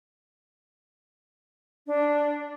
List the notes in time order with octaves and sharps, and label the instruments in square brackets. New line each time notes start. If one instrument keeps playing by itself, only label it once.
[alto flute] D4